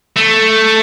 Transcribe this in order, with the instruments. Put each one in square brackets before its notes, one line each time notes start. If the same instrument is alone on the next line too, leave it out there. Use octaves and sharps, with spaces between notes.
[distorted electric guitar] A3